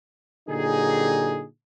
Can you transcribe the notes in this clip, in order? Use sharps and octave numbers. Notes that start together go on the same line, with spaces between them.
A#2 D3 F#3 D#4 G4 G#4